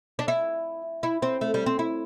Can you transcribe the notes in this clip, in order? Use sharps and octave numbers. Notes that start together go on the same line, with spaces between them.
D4
E4
E4
C4
A3
G3
C4
E4